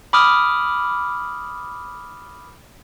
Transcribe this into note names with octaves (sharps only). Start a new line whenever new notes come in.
B5 D6 D#6 F6